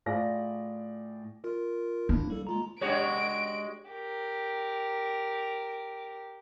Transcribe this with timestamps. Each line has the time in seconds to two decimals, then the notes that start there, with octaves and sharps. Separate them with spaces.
0.06 A2 F4 G#4 D5 A#6
1.44 F4 A#4
2.09 A#3 D4 E4
2.30 G3 A4
2.47 G#3 F4 A#5
2.81 G#3 D4 F#4 G4 C#5 D7
3.89 G4 A#4